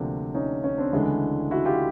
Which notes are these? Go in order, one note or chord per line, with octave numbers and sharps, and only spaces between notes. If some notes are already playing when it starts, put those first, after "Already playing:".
Already playing: D2 C3 F3 A#3 C4 D4
C#4 D#4
C#4
C4 D4
D2 C#3 E3 G#3 D4 E4
E4 F#4
F4 G4